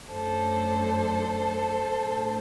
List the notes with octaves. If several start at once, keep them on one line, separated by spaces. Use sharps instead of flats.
F#2 F#3 A3 D4 A4 C5
A2 A3 D4